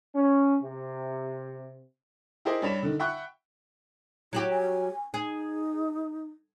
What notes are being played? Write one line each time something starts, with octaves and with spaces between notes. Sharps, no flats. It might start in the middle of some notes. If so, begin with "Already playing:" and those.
C#4
C3
E4 G4 G#4 A#4 C5 D#5
G2 G3 C#5 B5 E7
D3 D#3
E5 F#5 G5 B5 C#6 F#6
F#3 E4 F#4 G4
G#5
D#4 G#4